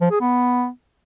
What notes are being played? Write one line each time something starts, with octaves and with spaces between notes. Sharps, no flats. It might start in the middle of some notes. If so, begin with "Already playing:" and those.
F3
G#4
B3